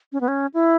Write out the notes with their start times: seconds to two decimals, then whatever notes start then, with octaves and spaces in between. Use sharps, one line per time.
0.12 C#4
0.21 B3
0.28 C#4
0.54 E4